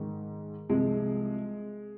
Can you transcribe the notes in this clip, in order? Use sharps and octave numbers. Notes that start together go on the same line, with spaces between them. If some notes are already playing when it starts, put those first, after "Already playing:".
Already playing: G#2 D#3
C2 C3 F3 G#3